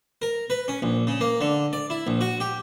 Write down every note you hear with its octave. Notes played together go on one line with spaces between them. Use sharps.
A#4
B4
C#4
A#1
C#3
A#3
D3
D5
E4
A#1
F#4
G4